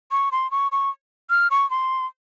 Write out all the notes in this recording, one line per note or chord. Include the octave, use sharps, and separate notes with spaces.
C#6
C6
C#6
C#6
F6
C#6
C6